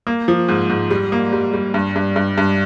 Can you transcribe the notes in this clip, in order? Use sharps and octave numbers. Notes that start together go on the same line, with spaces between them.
A#3
F3
G#2
G#2
G3
A#3
G3
G3
G2
G2
G2
G2